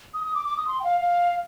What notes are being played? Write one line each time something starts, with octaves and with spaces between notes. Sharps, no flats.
D#6
D#6
D6
D6
D#6
C6
G5
F5
F5